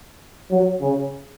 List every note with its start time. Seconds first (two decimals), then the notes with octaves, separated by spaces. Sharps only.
0.51 F#3
0.81 C#3